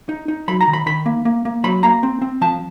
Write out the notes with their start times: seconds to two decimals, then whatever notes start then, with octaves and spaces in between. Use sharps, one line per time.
0.09 D#4
0.28 D#4
0.48 F#3 B5
0.61 A#5
0.68 D#3
0.73 B5
0.86 D#3 B5
1.06 A#3
1.25 A#3
1.45 A#3
1.64 F#3 B5
1.83 A#3 A#5
2.03 C4
2.22 C4
2.41 F3 A5